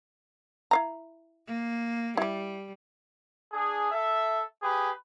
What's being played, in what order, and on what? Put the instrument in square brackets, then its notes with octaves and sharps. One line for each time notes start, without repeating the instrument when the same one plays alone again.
[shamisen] E4 F5 A#5
[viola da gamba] A#3
[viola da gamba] G3 [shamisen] E4 G4
[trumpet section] D4 G#4
A4 E5
G4 G#4 B4